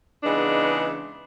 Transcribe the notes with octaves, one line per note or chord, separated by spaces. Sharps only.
C#3 E3 G#3 B3 D4 D#4